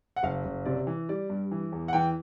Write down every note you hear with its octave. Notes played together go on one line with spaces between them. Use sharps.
F#5
F#1 F5
F#1
C3 D5
E3
G3 D5
G2
E3
E2
F#5
E3 G5